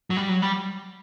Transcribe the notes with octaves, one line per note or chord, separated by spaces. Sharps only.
F#3
G3
F#3
G3